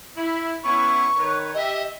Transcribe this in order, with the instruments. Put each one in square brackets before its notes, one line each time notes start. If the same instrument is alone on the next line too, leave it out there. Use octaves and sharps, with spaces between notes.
[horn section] E4
[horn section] B3 C#4 E4 [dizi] C#6
[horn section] D#3 B4 C#5
[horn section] G4 E5 [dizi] D#5